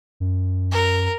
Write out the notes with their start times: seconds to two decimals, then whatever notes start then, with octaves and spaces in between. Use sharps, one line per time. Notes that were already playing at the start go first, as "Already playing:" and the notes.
0.20 F#2
0.72 A#4